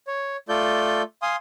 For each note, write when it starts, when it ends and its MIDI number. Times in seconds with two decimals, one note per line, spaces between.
0.07 0.37 73
0.49 1.02 57
0.49 1.02 65
0.49 1.02 69
0.49 1.02 74
0.49 1.02 91
1.22 1.36 77
1.22 1.36 80
1.22 1.36 84
1.22 1.36 87